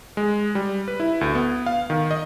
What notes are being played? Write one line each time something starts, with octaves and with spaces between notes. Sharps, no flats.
G#3
G3
B4
E4
D2
B3
F5
D#3
D#5